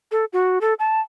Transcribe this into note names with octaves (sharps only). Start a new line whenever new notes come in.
A4
F#4
A4
A5